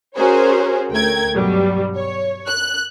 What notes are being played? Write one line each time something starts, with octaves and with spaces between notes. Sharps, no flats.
C#4 F#4 G#4 A#4 C5 C#5
D2 A3 A#4 G5 G#6
G2 B2 F#3 G3
C#5
F#6